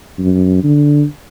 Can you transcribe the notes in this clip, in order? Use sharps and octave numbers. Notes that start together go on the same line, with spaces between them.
F#2
D3